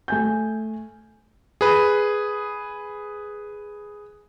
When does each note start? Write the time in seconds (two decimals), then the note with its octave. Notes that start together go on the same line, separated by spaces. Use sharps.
0.08 A3 G#5 G6
1.61 G#4 B4